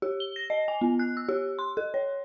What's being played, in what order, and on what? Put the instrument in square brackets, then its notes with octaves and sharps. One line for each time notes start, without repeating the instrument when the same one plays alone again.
[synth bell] G4
G7
A#6
D#5
G#5
B3
F#6
E6
G4
C6
A4
C#5